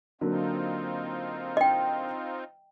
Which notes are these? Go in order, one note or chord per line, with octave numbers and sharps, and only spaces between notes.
D3 F#3 A#3 C4 D#4 F4
D#5 G5